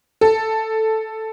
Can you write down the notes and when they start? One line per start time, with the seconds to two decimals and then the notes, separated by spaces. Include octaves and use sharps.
0.21 A4